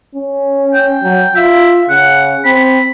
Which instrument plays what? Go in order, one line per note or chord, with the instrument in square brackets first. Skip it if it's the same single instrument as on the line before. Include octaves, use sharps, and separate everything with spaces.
[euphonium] C#4
[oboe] G5
[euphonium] F#3
[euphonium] F4 [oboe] E5
[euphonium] C#3 [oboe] F#5
[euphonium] C4 [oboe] B5